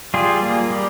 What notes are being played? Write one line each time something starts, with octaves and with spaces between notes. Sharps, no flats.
G3 F4 G#4
A#3
G3